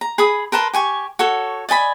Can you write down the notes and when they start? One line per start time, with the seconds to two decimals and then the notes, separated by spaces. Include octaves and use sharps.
0.01 A#5
0.18 G#4 B5 D#6
0.52 A#4 B4 A5 C6
0.73 G4 G#5 C#6
1.19 F#4 A4 C#5
1.69 D5 D#5 G#5 B5